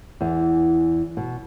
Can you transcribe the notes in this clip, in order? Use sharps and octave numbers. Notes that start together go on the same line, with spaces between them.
E2 E3
B2